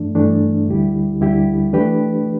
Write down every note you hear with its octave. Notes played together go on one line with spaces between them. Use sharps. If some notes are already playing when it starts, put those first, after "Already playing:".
Already playing: G2 E3 A3 D4
G2 E3 A3 D4
D2 D3 G3 E4 G4
D2 D3 G3 E4 G4
E3 A3 D4 G4 B4